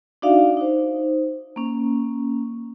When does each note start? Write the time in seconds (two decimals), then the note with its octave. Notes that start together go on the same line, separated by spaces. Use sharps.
0.22 D4 D#4 F#4 D5 E5 F5
0.57 D#4 C5
1.56 A#3 C#4